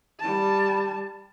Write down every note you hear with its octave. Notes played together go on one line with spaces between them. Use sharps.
G3 A5